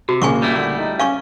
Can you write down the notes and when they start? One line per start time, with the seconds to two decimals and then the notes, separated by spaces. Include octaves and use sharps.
0.09 C3 F#4
0.22 A#1 C#3 A#3 G#5 C#6 D6
0.42 G3 A3 E4
0.57 D3
0.78 D#4
0.99 C#4 F5 G#5 C#6 D6